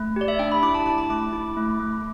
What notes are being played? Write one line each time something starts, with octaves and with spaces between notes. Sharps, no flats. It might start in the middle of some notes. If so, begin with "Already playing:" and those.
Already playing: A3
G4 D5
E5
D4 G5
B5
E4 D6
A5
E4 D6
D6
A3 D6
E4
A3
A3